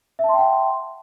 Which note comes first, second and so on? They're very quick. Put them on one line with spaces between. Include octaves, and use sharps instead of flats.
E5 A5 C6 G5 F#5